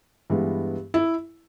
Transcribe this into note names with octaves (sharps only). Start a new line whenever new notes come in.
G2 E3 G#3 B3
E4